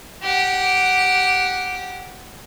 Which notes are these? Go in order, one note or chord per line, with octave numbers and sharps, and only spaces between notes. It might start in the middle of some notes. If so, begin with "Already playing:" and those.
G4 F#5